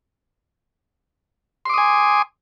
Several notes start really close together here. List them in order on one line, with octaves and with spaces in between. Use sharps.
C6 D6 D#6 G#5